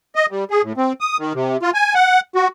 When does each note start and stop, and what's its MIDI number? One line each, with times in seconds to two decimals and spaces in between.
0.15 0.26 75
0.31 0.44 55
0.50 0.62 68
0.64 0.73 45
0.77 0.93 60
1.01 1.17 87
1.19 1.33 51
1.35 1.57 48
1.62 1.71 65
1.74 1.94 80
1.95 2.20 78
2.35 2.48 66